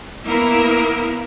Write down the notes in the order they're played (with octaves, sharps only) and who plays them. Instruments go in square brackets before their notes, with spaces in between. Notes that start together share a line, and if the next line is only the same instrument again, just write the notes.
[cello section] A#3 B3 E4 A#4